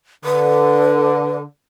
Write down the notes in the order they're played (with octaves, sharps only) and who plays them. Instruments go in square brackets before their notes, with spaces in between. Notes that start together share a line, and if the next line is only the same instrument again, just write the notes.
[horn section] D3 [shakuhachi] B4